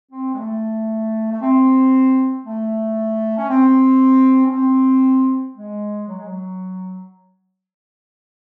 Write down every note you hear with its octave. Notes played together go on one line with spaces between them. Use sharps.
C4
G#3
A3
A3
C4
A3
C#4
C4
C#4
C4
G#3
F#3
G#3
F#3